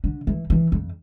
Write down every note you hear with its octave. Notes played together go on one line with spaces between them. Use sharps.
D3
E3
E3
F2